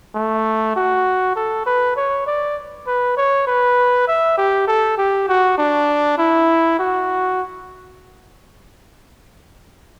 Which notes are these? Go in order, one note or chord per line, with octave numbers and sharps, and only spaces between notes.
A3
F#4
A4
B4
C#5
D5
B4
C#5
B4
E5
G4
A4
G4
F#4
D4
E4
F#4